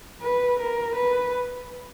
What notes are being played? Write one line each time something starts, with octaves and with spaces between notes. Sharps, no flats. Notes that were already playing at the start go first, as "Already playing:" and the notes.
B4
A#4
B4